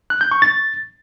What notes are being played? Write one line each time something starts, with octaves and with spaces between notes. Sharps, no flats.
F#6
G6
C#6
A6